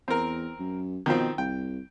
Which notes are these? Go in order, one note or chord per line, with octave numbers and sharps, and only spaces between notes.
E2 C4 A#4
F#2
B2 D#3 F3 C4
C2 G5